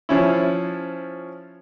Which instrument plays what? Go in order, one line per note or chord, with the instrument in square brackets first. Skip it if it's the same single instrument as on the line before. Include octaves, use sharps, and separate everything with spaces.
[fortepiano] F3 C#4 E4